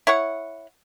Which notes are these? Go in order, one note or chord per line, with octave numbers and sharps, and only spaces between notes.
E4 C#5 F#5